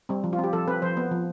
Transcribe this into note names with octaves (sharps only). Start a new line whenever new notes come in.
G3 C4
F3
F4
C4
G4
F3 A4
C4 B4
F3 C5
B3
F3